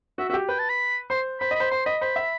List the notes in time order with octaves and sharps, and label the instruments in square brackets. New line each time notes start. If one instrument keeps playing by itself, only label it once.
[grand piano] F#4 [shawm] E5
[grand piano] F#4 [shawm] E5
[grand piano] G4
[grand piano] B4 [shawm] G5
[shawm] A5
B5
[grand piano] C5 [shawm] C6
[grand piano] C5 [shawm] B5
[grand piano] D#5
[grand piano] C5 [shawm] B5
[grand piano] C5 [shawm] C6
[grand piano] D#5 [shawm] B5
[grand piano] C5 [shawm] B5
[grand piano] E5